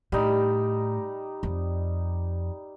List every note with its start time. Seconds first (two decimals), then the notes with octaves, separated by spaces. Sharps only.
0.12 A2 G3 D#4
1.43 F2